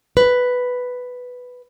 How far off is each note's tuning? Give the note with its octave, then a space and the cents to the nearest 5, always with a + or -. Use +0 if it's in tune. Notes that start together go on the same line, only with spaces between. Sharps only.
B4 +5